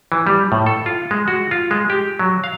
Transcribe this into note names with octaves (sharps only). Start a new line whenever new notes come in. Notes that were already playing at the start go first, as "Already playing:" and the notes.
E3
G3
A2
A4
F4
G#3
F#4
F4
G#3
G4
F#3
F5